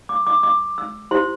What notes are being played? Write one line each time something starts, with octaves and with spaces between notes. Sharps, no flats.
D6
D6
D6
E6
E4 G4 C5 C6